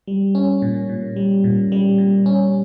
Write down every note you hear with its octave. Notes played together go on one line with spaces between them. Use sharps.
G3
C#4
A#2
A#2
G3
A#2
G3
A#2
C#4